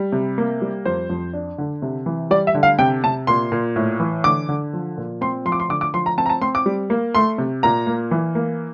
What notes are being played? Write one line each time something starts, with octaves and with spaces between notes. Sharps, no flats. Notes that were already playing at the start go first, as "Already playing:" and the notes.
Already playing: G3
C3
A#3
G3
F2 C5
F2
D4
D3
C3
E3
G3 D5
E5
D3
F5
C3 G5
C3 A5
A#2 C6
A#2
A2
E3
D3 D6
D3
F3
A#2
C4 C6
F3 C6
D6
C6
D3 D6
D6
F3 C6
A#5
C4 A5
A#5
A5
C4 C6
D6
G3
A#3
A3 C6
C3
A#2 A#5
A#3
E3
A#3